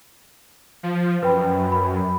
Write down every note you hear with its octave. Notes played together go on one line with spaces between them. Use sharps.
F3
F#2 B4 G5 B5
B5